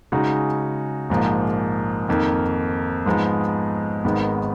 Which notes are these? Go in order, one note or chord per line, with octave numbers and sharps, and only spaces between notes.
C#3 G#3 D#4 F#4
A#1 G#2 F3 A#3
F2 D#3 A#3
G#2 F3 G#3 B3 D#4
G#1 G#2 D#3 G#3 B3